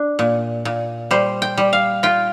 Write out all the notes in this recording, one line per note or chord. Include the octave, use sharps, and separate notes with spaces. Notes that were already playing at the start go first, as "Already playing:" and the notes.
Already playing: D4
A#2
A#2
G3 C5
G5
G3
F5
F4 G5